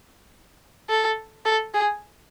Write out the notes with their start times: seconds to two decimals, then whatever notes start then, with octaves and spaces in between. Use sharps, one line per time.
0.89 A4
1.45 A4
1.74 G#4